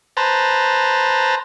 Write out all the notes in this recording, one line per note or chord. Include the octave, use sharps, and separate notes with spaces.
B4 C5 A5 A#5